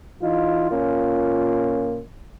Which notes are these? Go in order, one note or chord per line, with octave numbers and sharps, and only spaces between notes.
E3 D#4 F4
A#2 A#3 C#4 F4